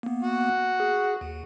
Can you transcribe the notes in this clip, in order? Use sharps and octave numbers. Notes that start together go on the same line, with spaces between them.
A#3 B3
F#4
G#4
D#2